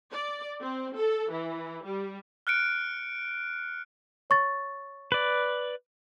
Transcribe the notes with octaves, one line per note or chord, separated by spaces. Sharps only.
D5
C4
A4
E3
G3
F6 F#6 C#7 D7
C#5 C#6 A6
B4 D5